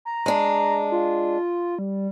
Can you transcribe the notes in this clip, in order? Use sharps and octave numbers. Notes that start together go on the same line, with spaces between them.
A#5
G#3 D4
F4
G3